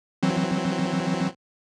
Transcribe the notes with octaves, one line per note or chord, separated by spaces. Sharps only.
E3 F#3 C4